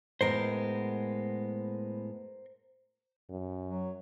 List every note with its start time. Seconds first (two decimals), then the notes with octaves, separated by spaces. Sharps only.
0.21 A2 G#3 B3 A#4 C5
3.30 F#2
3.66 F#3